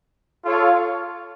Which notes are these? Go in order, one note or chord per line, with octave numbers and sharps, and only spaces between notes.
F4 A4 C#5 F5